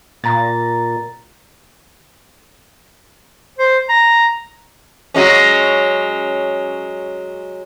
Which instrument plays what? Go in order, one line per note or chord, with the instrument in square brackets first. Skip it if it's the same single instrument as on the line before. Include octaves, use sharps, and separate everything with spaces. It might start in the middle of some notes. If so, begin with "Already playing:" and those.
[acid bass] A#2 [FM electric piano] A#5 A6
[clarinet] C5
A#5
[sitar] F#3 G#3 C#4